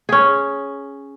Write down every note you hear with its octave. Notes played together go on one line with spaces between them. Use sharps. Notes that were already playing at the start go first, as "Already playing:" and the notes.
C#4 G#4